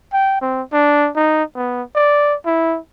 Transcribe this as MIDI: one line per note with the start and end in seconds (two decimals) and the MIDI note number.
0.13 0.39 79
0.41 0.62 60
0.72 1.09 62
1.16 1.43 63
1.55 1.82 59
1.95 2.35 74
2.46 2.78 64